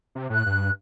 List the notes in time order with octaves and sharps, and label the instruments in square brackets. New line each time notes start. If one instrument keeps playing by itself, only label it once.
[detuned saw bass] C3
[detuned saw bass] A2 [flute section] F#6
[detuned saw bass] G2